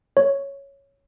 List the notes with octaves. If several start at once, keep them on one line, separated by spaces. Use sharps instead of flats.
C#5